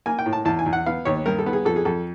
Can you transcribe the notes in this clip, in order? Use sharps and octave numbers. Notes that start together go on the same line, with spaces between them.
A#3 G#5
G5
A2
A5
E2 A5
G#5
E2
F#5
B3 F5
D#2 C#5
G2 A#4
A4
B3
G#4
F2 A4
G#4
F2 A4